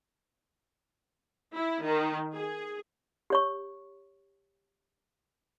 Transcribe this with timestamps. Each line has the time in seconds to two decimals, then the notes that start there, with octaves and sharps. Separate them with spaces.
1.54 E4
1.83 D#3
2.34 G#4
3.30 G4 C#5 C#6